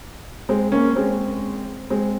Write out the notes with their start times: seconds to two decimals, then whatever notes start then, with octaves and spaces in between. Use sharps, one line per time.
0.49 G#3 C4
0.72 A#3 C#4
0.96 G#3 C4
1.90 G#3 C4